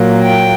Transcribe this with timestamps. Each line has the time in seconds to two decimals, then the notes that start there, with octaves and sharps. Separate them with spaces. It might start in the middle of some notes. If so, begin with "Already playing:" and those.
Already playing: A#2 F#3 A#3
0.22 G5